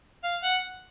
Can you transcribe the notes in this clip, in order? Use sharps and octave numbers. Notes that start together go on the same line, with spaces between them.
F5
F#5